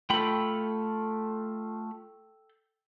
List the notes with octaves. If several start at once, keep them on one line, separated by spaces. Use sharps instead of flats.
A3 F4 A4 G5 B5